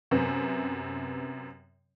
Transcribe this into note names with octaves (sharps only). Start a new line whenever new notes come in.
F#2 C3 B3 C4